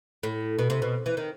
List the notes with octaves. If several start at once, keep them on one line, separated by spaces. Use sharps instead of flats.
A2
B2
C3
B2
E3
D#3